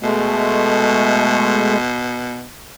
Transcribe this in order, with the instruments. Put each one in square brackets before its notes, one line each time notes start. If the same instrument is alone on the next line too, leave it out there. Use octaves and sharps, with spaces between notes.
[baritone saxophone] B2 [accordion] G#3 A3